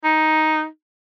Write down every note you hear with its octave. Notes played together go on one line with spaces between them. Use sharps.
D#4